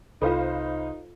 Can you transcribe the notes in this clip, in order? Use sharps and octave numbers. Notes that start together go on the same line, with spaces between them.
C2 D#4 F4 A4 B4 C5 F5